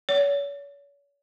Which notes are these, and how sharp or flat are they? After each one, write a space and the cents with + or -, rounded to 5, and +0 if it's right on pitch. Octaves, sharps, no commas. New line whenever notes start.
C#5 +40